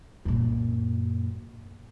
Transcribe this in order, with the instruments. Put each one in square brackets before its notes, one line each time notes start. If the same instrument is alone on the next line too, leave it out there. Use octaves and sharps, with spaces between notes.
[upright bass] F#2 A#2